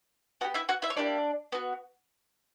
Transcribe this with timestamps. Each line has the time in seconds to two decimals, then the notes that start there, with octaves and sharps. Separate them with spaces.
0.41 B3 E4 F#4 G4 F#5
0.54 E4 E5
0.69 F#4 F#5
0.82 E4 E5
0.90 C#5
0.97 A#3 D4 E4 G4 D5
1.52 B3 F#4